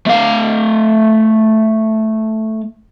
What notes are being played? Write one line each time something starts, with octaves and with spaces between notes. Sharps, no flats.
A3 F5